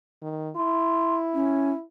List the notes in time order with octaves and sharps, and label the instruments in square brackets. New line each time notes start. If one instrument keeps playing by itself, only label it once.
[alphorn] D#3
[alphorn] E4 [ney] C6
[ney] C#4